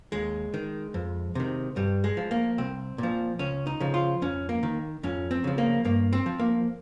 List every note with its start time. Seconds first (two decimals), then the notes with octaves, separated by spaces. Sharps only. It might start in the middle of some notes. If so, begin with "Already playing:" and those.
0.12 D#2 G#3
0.54 D#3
0.94 F2
1.35 C3 D#3
1.76 G2 G3
2.04 G#3
2.17 F3
2.31 A#3
2.58 C2 C4
2.98 A#2 F3
3.39 C#2 C#4
3.67 D#4
3.80 C#3 F3
3.94 F4
4.22 F2 C#4
4.49 A#3
4.63 D#3
5.03 F2 C#4
5.31 C4
5.44 C#3 F3
5.58 A#3
5.85 G2 A#3
6.13 C4
6.26 F3
6.39 A#3